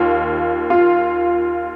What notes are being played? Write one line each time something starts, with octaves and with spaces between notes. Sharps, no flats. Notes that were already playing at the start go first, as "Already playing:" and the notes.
Already playing: D#2 F4
F4